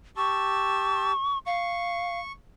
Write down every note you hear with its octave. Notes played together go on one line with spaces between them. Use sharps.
G4 A5 C#6 E6
F5 C#6